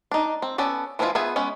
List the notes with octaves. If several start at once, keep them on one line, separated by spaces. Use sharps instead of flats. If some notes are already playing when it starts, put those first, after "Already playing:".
D4 D#4
C4
B3 C#4 A4 D5
E3 F3 G#3 E4 F4
B3 F4 G#4 E5 G#5
G#3 B3 C#4